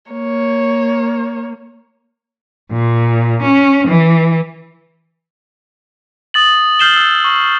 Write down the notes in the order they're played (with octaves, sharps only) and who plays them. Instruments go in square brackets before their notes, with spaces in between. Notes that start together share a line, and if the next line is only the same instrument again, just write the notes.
[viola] A#3 [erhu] C#5
[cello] A#2
C#4
E3
[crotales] D#6 A6 F#7
F6 G6 C7 E7 F#7 G7
E6
C#6